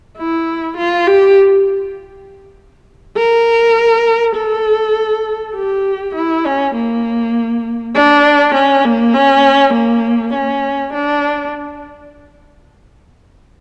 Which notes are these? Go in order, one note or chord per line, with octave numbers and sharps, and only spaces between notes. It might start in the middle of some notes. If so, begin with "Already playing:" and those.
E4
F4
G4
A#4
A4
G4
E4
C#4
A#3
D4
C#4
A#3
C#4
A#3
C#4
D4